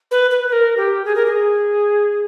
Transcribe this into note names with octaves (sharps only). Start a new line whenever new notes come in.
B4
B4
B4
A#4
G4
G#4
A#4
G#4